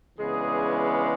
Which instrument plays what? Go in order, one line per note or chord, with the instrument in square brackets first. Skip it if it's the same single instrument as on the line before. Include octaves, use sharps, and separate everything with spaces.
[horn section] C#3 E3 G#3 B3 D4 G#4